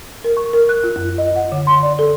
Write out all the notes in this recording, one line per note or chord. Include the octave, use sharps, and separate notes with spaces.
A#4
C#6
A#4
F#6
F4
F#2
D#5
F#5
D3
C6
D5
A4